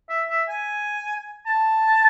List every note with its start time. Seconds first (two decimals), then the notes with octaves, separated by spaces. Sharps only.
0.09 E5
0.29 E5
0.49 G#5
1.47 A5